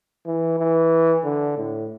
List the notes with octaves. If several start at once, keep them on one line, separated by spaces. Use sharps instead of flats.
E3
E3
D3
A2